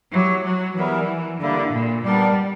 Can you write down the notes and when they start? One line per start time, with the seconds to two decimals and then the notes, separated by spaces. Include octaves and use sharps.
0.13 F#3 E4 G4 C#5
0.45 F#3
0.77 E3 G3 B3 E4 A#4
1.42 D3 G3 A#3 E4
1.74 A#2
2.05 G3 B3 D4 A#4 D5